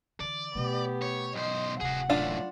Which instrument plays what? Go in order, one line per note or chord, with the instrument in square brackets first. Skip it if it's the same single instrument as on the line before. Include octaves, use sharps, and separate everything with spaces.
[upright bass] D3 E3 [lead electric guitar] D5
[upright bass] B2 A3 [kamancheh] B3 G4
[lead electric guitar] C#5
[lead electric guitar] B1 C5 [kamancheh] D#5
[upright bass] D1 C3 [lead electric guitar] F#4 G#4 [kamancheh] F#5
[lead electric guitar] F#2 A2 [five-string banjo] D4 F4 F5